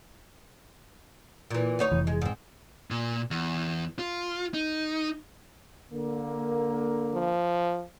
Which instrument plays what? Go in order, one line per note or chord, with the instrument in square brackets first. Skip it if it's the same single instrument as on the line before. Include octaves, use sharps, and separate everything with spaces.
[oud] A#2 E3
D2 D#4 C#5
[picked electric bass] F1 E3
[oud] G#3
G#2 C4
[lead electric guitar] A#2
E2
F4
D#4
[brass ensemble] D3 A#3
[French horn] F3